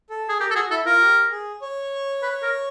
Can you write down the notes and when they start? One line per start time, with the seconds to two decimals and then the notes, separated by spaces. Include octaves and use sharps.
0.10 A4
0.29 G#4
0.40 G4 A#4
0.50 A4
0.55 F#4 G#4
0.70 E4 A4
0.86 F4 A#4
1.01 G4
1.31 G#4
1.62 C#5
2.22 B4
2.43 A#4